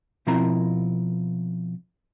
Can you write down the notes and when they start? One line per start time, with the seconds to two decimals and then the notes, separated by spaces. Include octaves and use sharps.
0.27 B2 F3 C4 E4 A#4 A#5